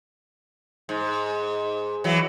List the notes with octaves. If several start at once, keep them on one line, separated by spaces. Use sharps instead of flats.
G#2
E3 F#3